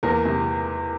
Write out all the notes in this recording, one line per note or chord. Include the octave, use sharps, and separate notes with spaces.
E2 A#3 A#4
C3